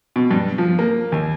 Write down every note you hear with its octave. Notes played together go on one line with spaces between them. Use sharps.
B2
G2
F3
A#3
D#2